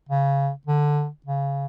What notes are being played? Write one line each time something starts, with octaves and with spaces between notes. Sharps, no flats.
C#3
D3
C#3